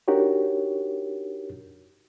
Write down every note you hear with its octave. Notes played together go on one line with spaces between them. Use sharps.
D4 D#4 F#4 G4 A#4 C#5